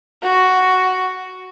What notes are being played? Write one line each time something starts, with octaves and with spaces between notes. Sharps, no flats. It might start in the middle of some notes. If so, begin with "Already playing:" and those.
F#4